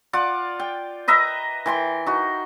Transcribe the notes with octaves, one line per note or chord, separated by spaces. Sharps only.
F4 D5 F#5
G5
B4 D#5 E5 A#5
E3 G5 C6
D#4 F#4